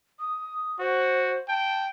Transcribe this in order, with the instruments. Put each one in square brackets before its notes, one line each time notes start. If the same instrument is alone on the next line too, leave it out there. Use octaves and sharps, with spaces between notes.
[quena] D#6
[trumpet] F#4 [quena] C5
[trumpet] G5 [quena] A5